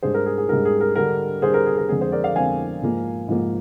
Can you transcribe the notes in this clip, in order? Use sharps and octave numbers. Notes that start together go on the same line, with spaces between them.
G#2 G3 D4 G#4 C5
A#4
G#4
G#4
G#2 G3 D4 A#4
G#4
A#4
D3 G3 D4 A#4
D3 G3 D4 G#4 C5
A#4
G#4
A#4
F2 D3 G#3 C4 G#4
G#4 C5
A#4 D5
D5 F5
F2 D3 G#3 C4 F5 G#5
G#2 F3 A#3
G#2 F3 A#3